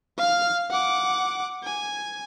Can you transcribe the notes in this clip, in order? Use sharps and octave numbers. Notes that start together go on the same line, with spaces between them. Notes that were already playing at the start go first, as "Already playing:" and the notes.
F5 F6
F#5 D6
G#5